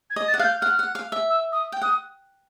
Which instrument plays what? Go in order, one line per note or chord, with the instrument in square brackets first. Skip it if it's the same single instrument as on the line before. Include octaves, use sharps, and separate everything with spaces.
[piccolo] G#6
[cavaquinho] D#5
[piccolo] A6
[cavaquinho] F#5
[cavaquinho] F5 [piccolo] F#6 G6
[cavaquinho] F#5 [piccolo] F6
[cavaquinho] F#5
F5
E5
[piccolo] E6
D#6
[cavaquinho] G5
[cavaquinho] F#5 [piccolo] D#6